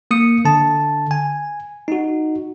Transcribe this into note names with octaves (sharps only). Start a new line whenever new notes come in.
A#3 D#6 C#7
D3 A5
G#5
D#4 F#4